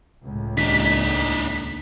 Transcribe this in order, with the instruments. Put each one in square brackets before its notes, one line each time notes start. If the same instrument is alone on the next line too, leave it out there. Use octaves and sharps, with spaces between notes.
[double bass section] C#2 A2
[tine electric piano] D#2 [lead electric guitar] D4 D#4 [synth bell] B6